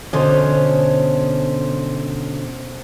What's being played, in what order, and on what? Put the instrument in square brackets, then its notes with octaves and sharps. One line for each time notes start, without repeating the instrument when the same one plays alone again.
[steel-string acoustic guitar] B2 D3 C#4 [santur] C5 D#6